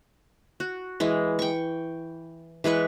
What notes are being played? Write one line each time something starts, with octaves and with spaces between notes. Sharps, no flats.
F#4
E3 G#3
G5 C#6
E3 G#3 B4 C#6